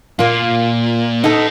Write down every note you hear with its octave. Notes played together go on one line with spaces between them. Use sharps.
A#2 A#3 F4
D#4 A4 D#5 F#5